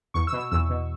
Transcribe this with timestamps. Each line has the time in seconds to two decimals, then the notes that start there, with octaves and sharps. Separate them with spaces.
0.14 E2 C#6
0.27 E6
0.32 B2
0.39 E6
0.51 E2 E6
0.70 B2